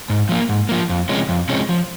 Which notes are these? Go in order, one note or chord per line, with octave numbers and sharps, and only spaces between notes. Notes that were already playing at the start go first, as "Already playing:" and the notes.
G#2
F3 A#3
G#2
F3 A#3
F2
C3 F3 G#3 C#4
F2
C3 F3 G#3 C#4
F3